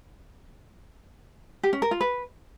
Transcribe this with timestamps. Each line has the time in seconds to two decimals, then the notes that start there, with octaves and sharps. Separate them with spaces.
1.63 G4
1.73 C#4
1.82 A#4
1.91 F4
2.01 B4